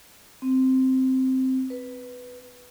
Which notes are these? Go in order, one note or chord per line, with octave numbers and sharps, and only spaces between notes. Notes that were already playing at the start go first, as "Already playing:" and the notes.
C4
B4